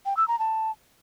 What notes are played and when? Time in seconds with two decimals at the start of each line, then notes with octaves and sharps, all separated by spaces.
0.06 G5
0.17 E6
0.28 A#5
0.39 A5